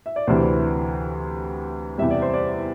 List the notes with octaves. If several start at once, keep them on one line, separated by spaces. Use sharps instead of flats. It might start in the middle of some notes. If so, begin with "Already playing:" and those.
E5
D5
D2 C3 E3 C5
E2 C3 G3 E5
D5
C5
D5